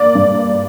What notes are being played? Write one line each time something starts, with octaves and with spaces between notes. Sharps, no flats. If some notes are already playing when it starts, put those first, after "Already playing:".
Already playing: A#3 D5
G2